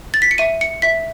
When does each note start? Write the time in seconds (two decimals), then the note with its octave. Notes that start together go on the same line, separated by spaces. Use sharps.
0.14 A6
0.22 B6
0.31 C#7
0.38 E5 D#7
0.61 C#7
0.82 E5 B6